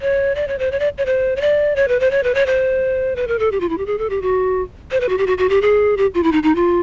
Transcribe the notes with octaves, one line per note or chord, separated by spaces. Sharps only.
C#5
D5
C#5
C5
C#5
D5
C#5
C5
C#5
D5
C#5
B4
C5
C#5
B4
C#5
C5
B4
A#4
A4
G4
F4
E4
G4
G#4
A4
G4
F#4
C5
B4
F#4
G4
F#4
F#4
G4
G#4
G4
F4
E4
D#4
D#4
F4